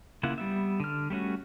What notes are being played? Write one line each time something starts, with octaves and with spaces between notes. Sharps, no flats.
C#3 A#3 E4 F4 F#5
G3 B3 E5
D3 F6
G3 A3 C#4 F#4